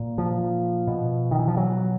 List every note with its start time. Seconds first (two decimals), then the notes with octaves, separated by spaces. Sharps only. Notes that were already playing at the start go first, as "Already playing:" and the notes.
Already playing: A#2
0.18 F3
0.87 B2
1.31 D#3
1.39 E3
1.48 F3
1.57 F#3